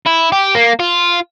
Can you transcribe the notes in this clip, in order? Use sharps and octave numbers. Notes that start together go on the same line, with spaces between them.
E4
G4
A#3
F4